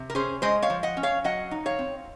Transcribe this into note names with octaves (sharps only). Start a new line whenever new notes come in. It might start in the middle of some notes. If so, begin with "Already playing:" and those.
Already playing: C3
A#4
C#4 G#4 C5
G#3 C5 D#5
C#5 F5
F3
D#5 F#5
C#4
C#5 F5
F#3 D#5 F#5
D#4
C#5 F5
C4